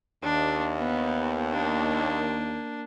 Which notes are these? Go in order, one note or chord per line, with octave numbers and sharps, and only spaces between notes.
D#2 D4
B3
A#3 D4